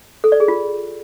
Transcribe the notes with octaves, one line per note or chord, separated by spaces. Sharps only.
A4
D5
G#4
F4